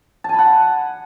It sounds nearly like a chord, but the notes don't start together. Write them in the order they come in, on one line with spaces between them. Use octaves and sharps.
A5 G#5 B5 F#5